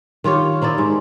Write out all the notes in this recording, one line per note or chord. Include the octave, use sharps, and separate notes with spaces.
D#3 F4 G4 C#5
C4 D#4 E4 D5
G#2